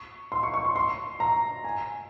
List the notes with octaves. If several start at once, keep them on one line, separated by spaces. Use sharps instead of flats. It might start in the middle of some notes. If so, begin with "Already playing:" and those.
Already playing: C#6
C6
C#6
C#6
C6
C6
A#5
G#5